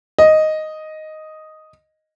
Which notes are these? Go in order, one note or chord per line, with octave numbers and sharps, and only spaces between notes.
D#5